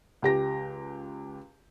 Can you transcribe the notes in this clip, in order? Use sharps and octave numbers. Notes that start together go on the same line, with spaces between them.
C#2 G4 A#6